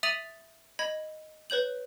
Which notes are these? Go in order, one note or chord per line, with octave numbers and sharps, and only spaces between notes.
E5 D#6 A6 D#7 F7 F#7
D#5 B5 G#6
B4 C#5 G6 F#7